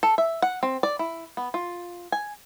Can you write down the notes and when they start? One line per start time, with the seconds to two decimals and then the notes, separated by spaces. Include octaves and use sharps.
0.03 A4
0.18 E5
0.42 F#5
0.63 C4
0.83 D5
0.99 E4
1.37 B3
1.54 F4
2.12 G#5